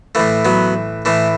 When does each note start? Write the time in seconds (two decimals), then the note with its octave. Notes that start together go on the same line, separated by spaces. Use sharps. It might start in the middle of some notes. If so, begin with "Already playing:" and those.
0.15 A2 E3 A3
0.45 F#3 B3
1.05 A2 E3 A3